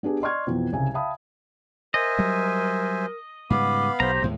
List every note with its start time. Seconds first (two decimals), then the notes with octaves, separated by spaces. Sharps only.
0.03 B3 D4 G4 G#4
0.21 D5 D#5 C6 C#6 F6 G#6
0.47 F2 B2 E3
0.73 C2 C#3 G#5
0.94 E5 F5 G5 A5 B5 D#6
1.94 A#4 C5 D#5 E5 G#5
2.19 F#3 G3
3.50 G#2 C#3 G3 B3 F5 B5 D6
4.00 B1 G4 C5 A#5
4.22 D#2 A2 G#3